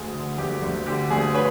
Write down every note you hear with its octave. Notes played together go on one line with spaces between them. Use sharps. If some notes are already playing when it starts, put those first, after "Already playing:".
Already playing: D2 G#4
D3
D2 G4
D2
D3 G4
D2 G#4
B4 C#5